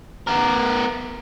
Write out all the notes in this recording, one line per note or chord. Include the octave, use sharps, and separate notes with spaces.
B3 A#4